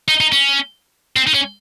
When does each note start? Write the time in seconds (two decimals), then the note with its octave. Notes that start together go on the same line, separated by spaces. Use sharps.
0.08 D#4
0.20 D#4
0.32 C#4
1.16 C4
1.27 D#4
1.34 C#4